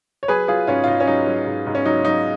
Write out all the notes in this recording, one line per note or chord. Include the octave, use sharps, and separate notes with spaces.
C#5
F#3 G#4 B4
F#3 F4 G#4
G#2 C#4 F4
F4
G#2 D#4
C#4
F#3 D#4
F#3
G#2
G#2
C#4
F#3 D#4
F#3 D#4